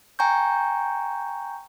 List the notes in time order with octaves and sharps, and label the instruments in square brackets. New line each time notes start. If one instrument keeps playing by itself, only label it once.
[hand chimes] G5 G#5 A#5 C#6 G6